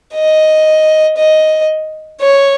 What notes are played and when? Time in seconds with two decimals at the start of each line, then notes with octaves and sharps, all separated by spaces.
0.14 D#5
1.17 D#5
2.21 C#5